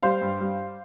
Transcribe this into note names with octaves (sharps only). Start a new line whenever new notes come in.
G3 C5 F5
G2
G3